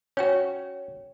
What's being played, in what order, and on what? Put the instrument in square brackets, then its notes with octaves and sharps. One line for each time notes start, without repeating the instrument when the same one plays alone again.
[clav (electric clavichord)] C#4 F#4 [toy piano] C#5 G5